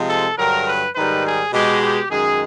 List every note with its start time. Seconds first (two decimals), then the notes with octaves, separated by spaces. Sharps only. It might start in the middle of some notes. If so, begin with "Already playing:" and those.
Already playing: C3 F3 G#3
0.09 A4
0.38 G2 D3 F#3 A#4
0.67 B4
0.96 G#2 D#3 G3 B4
1.25 G#4
1.53 B2 G#3 G4
1.82 G4
2.11 F#2 D#3 G#3 G#4